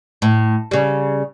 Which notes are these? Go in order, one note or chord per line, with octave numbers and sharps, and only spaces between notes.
A2
C#3 G3